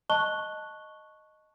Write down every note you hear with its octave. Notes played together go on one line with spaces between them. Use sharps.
D#5 A5 C#6 F#6 G7